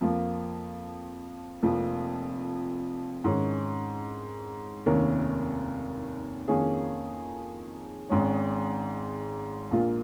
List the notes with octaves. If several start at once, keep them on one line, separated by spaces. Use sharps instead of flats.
F2 F3 A#3
F1 F2 F3 A#3
G#2 D#3 C#4
F1 D#2 D#3 C#4 A#4
F2 D#3 A#3 C#4 G#4
G#1 G#2 G#3 C#4
A#1 A#2 A#3 F4